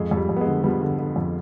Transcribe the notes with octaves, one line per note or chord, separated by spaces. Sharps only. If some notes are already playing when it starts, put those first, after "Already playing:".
Already playing: F2 G#3
F2
G3
F2
B3
G#3
D3
F3 G3 B3
D3
D3
F2